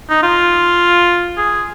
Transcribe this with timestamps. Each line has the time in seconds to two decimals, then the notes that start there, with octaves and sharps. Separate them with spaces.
0.10 D#4
0.23 F4
1.38 G#4